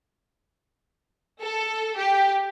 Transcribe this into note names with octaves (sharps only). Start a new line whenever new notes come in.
A4
G4